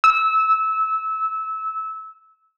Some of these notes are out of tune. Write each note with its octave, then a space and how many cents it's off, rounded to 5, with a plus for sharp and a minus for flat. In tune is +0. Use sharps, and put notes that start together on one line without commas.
E6 -20